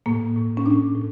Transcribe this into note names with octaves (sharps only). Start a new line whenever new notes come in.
A2 A#3
A2
C#4
A2 D4
A2